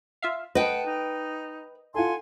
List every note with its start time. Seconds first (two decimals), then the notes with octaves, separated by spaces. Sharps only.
0.22 F4 E5 F5
0.55 B4 D#5 F#5 G5 A5
0.85 D#4
1.94 F4 A4 F#5 G#5 C6